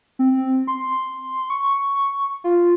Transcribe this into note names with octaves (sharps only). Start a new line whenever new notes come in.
C4
C6
C#6
F4